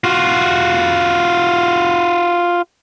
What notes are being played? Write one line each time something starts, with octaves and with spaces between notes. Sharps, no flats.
F4 F#4